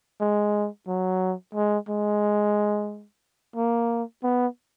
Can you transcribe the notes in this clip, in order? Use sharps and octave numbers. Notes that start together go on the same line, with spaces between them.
G#3
F#3
G#3
G#3
A#3
B3